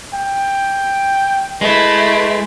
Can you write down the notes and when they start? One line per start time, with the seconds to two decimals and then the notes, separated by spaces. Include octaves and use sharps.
0.14 G5
1.61 G#3 A3 E4 B4